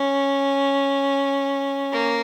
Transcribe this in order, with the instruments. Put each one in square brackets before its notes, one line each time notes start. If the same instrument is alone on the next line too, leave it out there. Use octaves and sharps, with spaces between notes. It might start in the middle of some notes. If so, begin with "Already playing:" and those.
Already playing: [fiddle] C#4
A#3